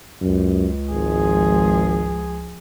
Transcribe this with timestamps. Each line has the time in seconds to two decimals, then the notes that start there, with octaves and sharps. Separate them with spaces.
0.21 C#2 F#2
0.92 G#1 F3 G#4